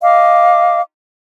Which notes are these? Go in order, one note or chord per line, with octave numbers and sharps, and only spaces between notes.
D#5 F5 D6